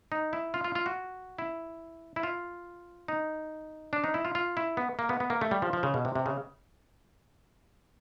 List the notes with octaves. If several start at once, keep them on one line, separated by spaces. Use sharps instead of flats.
D#4
E4
F4
F4
F4
F#4
E4
E4
F4
D#4
D4
D#4
E4
F4
F4
E4
B3
A#3
B3
B3
A#3
A3
G3
F3
F3
C#3
B2
C3
C3
C#3